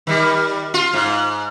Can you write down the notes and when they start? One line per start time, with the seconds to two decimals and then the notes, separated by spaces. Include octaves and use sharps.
0.07 D#3 G3
0.74 F4
0.93 G#2